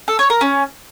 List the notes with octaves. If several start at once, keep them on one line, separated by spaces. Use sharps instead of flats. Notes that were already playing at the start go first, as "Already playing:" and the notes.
A4
C#5
A#4
C#4